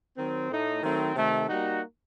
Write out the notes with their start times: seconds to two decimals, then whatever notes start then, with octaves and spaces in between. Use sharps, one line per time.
0.17 D#3 F#3 C4
0.50 A2 A3 D#4
0.83 D#3 F#3 A3 C4
1.16 C3 D#3 A3
1.49 G3 A#3 D#4 F#4